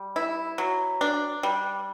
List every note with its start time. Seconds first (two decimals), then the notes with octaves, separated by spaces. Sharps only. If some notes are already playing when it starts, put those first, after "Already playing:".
Already playing: G3
0.16 E4
0.58 F#3
1.01 D4
1.43 G3